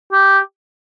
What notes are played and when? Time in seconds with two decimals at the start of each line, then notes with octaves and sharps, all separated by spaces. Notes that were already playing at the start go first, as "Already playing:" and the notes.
0.12 G4